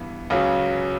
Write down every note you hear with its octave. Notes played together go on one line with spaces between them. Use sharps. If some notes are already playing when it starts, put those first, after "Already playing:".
Already playing: G2 E3 B3
C#2 C#3 F#3